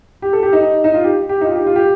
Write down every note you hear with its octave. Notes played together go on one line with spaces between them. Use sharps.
G4
A4
G4
D#4
D#4
F4
G4
G4
D#4
F4
G4
F4
G4